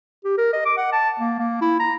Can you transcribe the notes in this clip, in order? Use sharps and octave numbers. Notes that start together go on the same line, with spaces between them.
G4
A#4
D#5
D6
F#5
A5
A#3
A#3
E4
A#5